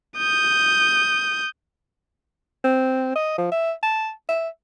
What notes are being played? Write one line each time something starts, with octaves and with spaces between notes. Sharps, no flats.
D#6 G6
C4
D#5
F3
E5
A5
E5